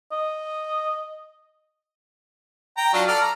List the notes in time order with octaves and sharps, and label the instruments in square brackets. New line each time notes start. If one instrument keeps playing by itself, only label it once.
[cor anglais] D#5
[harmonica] G5 A#5
F#3 D4 F4
A4 D5 F6
A#5